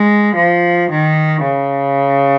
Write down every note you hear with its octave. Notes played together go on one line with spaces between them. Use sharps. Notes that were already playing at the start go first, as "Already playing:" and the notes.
Already playing: G#3
F3
D#3
C#3